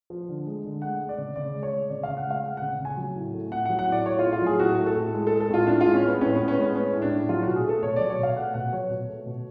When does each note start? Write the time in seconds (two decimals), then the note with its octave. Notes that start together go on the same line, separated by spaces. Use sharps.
0.10 F3
0.29 D3
0.46 G#3
0.64 D3
0.82 G#3 F#5
1.00 G#3
1.09 D5
1.18 C#3
1.36 C#3 D5
1.54 G#3
1.63 C#5
1.72 G#3
1.90 C#3 D5
2.03 C#3 F5
2.17 F#5
2.26 G#3 F5
2.44 G#3 F#5
2.57 C#3 F#5
2.80 C#3
2.85 G#5
2.97 F#3
3.16 A2
3.34 A3
3.51 A2 F#5
3.65 F#3 F#5
3.79 F#5
3.87 A2 D5
4.05 A3 C#5
4.19 A2 F4
4.33 F4
4.42 F#3 G#4
4.59 A2 F#4
4.78 A3
4.86 A4
4.96 A2
5.13 G#3
5.27 G#3 A4
5.40 A4
5.49 A2 F4
5.67 A2 D4
5.81 G#3 F4
5.94 C#4
6.03 G#3 B3
6.21 A2 C#4
6.35 A2 B3
6.48 C#4
6.57 G#3 B3
6.74 G#3 C#4
6.93 A2
7.02 D4
7.11 A2
7.29 F#3 F4
7.42 B2 F#4
7.56 G#4
7.64 A3 A4
7.83 B2 C#5
7.96 F#3 D5
8.10 C#5
8.19 B2 F5
8.36 A3 F#5
8.54 B2 F#5
8.73 F#3 C#5
8.90 B2
9.09 A3
9.26 B2